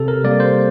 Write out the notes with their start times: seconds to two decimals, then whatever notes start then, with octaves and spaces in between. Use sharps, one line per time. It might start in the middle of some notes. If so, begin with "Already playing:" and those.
Already playing: C3 A4
0.08 A#4
0.24 G3 A#3 D5
0.40 C5